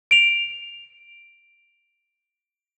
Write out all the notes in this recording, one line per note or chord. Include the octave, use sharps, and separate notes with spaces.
D7 F7